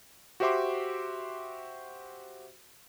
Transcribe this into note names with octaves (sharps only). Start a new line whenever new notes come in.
F#4 G4 C5 E5 C6 D6